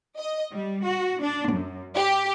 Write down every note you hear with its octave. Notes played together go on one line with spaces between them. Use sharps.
D#5
G3
F#4
D4
F#2
G4